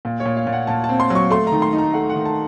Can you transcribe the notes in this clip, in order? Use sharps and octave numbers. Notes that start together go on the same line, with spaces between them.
A#2
C#5
A#2
F5
A#2
F#5
A#2 A5
A5
C4
C6
F#3
C#6
A3 C6
A#5
D#3
C6
D#4
A#5
A3 F#5
F#5
D#3
A5